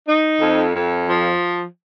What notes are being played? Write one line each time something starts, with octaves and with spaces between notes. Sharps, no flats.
D#4
F2
F2
F3